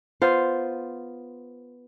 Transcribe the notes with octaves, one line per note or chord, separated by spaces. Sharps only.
B3 F4 C5